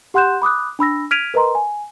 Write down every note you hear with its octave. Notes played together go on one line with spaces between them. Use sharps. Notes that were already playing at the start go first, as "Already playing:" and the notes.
G4 F#5 C6 F#6 G6 E7
B5 D6 D#6 F#6
D4 B5 E6 A#6
F6 G#6 B6 D7 D#7 F7
A#4 B4 D#5 A#5 C6
G#5